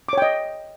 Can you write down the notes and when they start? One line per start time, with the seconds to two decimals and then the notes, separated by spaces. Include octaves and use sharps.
0.09 D6
0.13 C#5
0.18 G5
0.22 D#5